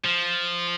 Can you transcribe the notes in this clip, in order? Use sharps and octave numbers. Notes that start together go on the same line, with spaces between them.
F3